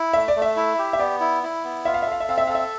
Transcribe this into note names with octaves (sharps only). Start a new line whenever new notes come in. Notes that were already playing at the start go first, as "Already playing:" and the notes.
Already playing: E4
A3 E5
D5
A3
E5
E4
G4
E5
B3 D5
E4
E4
B3
F4 E5
F5
E5
A4 F5
E5
C4 F5
E5
A4 F5
E5